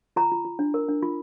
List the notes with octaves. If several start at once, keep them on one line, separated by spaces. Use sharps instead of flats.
F4 A#5
F4
F4
D4
A#4
D4
F4